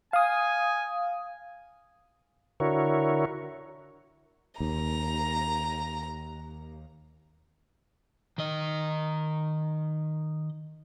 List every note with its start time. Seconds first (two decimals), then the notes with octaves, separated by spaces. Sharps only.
0.13 F5 G#5 D#6
2.60 D3 E4 F#4 A#4 C#5
4.60 D#2 A#5
8.38 D#3 D#5